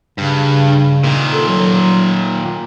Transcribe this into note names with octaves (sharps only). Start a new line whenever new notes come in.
G2 C#3
A#2 D#3
A4
F#3